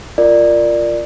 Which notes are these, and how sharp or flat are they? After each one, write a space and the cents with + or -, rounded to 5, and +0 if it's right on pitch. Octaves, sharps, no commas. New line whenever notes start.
F4 -10 A#4 -10 D5 +15